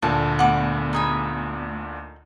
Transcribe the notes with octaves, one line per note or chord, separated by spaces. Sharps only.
D2 A#2 D3 A5
A3 B3 F#5 D6
D#4 G#4 B5